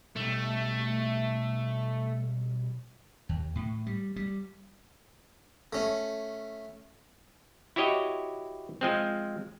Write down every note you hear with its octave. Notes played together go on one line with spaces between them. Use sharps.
B1 G3 A3
D#2
A2
G3
G3
A3 C#4
E4 F#4 G4 C#5 D#5
F3 G#3 C4